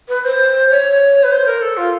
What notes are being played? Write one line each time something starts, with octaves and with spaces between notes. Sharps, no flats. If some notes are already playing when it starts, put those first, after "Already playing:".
B4
C5
C#5
B4
C5
A#4
A4
F4